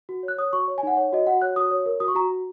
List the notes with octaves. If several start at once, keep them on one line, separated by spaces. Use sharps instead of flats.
F#4
C#5
F#6
C#5 D#6
F#4 C#6
C#5
G#5
D#4 F#5
C#5
F#4 D#5
F#4 F#5
C#5 F#6
F#4 D#6
C#5
A#4
F#4 D#6
C#6
F#4 A#5
F#4